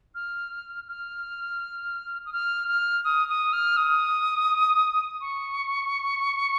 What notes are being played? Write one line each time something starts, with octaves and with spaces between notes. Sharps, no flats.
F6
F6
D#6
F6
F6
D#6
D#6
F6
D#6
C#6